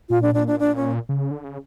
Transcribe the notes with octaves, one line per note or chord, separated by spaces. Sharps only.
A#2 F4
D4
D4
D4
D4
C#4
C#3
D3
C#3